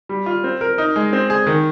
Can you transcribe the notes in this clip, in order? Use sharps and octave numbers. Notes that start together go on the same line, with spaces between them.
G3
F4
C4
A#4
D#4
G#3
C4
G#4
D#3